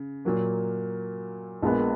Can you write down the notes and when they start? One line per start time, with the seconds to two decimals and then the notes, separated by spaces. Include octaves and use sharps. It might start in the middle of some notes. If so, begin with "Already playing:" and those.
Already playing: C#3
0.25 A#2 F#3 A#3
1.62 A#1 A#2 G#3 B3